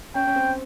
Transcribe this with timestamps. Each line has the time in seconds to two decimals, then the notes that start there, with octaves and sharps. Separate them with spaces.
0.15 C#4 G5
0.27 C#4
0.36 C4